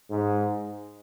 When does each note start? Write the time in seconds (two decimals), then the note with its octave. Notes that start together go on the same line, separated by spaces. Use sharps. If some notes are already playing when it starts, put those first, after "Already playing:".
0.10 G#2